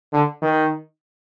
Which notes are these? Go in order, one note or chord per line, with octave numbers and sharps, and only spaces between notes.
D3
D#3